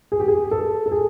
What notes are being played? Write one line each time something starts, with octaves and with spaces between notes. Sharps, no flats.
G#4
G4
G#4
A4
A4
G#4